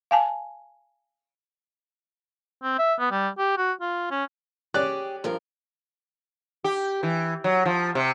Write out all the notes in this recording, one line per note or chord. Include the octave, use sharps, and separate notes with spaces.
F5 G#5 A5
C4
E5
B3
G3
G4
F#4
F4
C#4
C#4 G4 G#4 D5 F#6
G2 F3 A#4
G4
E3
F#3
F3
C3